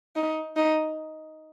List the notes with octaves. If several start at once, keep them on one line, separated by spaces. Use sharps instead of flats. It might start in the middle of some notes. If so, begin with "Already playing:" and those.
D#4
D#4